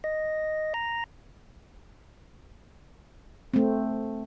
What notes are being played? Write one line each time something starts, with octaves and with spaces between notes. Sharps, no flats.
D#5
A#5
A3 C4